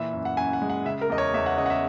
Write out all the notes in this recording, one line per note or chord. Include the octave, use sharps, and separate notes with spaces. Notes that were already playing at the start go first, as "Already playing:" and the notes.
Already playing: A#2 E3 E5
F#2
F#5
F#2 G#5
F#5
G#3
F#5
C#3 E5
A#4
E2 D#5
C#5
E2 E5
F#5
C#3 D#5
F#5
E5